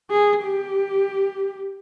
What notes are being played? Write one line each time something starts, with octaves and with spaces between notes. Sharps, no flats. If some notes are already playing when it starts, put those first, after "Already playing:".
G#4
G4